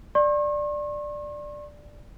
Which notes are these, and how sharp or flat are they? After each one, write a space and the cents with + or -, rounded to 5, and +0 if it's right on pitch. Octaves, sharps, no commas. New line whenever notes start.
D5 +5 C#6 -45